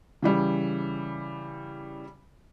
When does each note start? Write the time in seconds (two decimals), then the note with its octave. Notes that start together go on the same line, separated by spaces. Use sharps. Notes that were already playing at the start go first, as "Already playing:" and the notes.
0.22 C#3 E3 G3